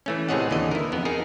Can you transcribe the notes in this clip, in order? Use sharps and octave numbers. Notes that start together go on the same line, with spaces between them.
E3 A3 C#4
A2 C3 G#4 C#5 D#5 F#5
D#2 D3 E3 D#5
E4 A#4
F2 B3
D#4 G#4 A#4